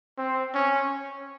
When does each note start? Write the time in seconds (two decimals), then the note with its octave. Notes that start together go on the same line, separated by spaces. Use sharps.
0.18 C4
0.54 C#4